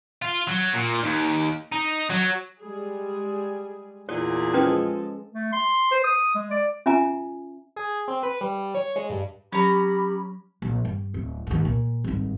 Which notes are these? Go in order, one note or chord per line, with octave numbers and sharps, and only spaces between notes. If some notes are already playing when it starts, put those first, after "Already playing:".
F4
F#3
A#2
D#2
D#4
F#3
G3 G#3 G#4
E2 A#2 G#4 C#5
F3 G#3 C#4 A4 B4 D#6
A3
C6
C5
D#6
G#3
D5
C#4 F4 E5 G#5 A#5
G#4
C4
B4
G3
C#5
G#3
G2
F#3 C#4 G4 A#5 B5
A#1
G2 G3
D1
D#2 G#2
A#2
G#1 G2